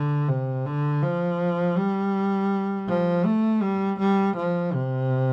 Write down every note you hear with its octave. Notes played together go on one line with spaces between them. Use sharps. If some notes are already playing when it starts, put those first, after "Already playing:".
Already playing: D3
C3
D3
F3
G3
F3
A3
G3
G3
F3
C3